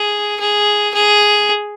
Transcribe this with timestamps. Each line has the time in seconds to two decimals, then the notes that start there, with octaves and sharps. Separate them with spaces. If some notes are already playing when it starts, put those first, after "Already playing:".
Already playing: G#4
0.40 G#4
0.94 G#4